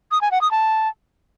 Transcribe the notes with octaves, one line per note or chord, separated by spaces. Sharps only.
D#6
G#5
F#5
D#6
A5